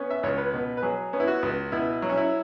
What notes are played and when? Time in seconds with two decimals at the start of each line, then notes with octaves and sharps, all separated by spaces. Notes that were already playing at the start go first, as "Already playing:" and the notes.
Already playing: B3 C#4
0.10 E5
0.23 C#2 C#5
0.38 B4
0.54 B2
0.77 B4
0.82 F#3 G#4
1.13 B3 C#4
1.20 E4
1.27 F#4
1.43 C#2
1.72 B2 E4
2.02 F#3
2.10 C#4
2.17 E4